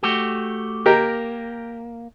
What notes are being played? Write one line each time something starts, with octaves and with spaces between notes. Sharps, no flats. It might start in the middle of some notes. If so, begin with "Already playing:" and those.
A3 F#4 G4
A#3 G4 A#4 G5